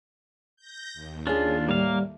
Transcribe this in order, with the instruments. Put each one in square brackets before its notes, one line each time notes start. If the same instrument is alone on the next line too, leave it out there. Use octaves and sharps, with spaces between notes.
[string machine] G6 A#6
D#2
[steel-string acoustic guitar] C#4 G#4 [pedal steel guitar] D4 F4
[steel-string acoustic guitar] A2 [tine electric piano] G3 [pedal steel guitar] A#3 F5